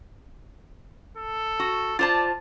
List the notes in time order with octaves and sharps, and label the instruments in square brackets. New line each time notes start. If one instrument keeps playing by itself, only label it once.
[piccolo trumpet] A4
[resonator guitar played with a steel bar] F#4
[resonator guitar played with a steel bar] F4 C5 A5 [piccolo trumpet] D5 [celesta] A6